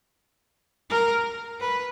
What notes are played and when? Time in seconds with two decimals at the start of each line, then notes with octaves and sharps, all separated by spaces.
0.90 A#4
1.60 B4